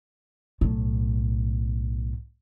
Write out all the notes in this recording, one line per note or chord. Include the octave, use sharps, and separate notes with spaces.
B1 A2